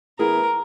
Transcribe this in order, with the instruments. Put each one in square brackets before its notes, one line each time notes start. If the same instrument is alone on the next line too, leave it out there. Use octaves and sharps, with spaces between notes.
[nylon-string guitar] E3 B3 E4 G#4 [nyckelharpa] A#4